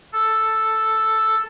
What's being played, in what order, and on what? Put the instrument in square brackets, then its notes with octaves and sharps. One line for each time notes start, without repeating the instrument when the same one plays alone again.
[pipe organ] A4